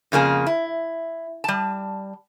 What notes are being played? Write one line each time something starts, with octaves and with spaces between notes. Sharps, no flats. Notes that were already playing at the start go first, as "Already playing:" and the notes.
F2 C#3 A#3 G#4
E4
G3 A5